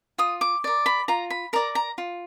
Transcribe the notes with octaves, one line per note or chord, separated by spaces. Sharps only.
F4 D#6
D6
A#4 D5
B5
F4 A#5
B5
A#4 D5 A#5
A#5
F4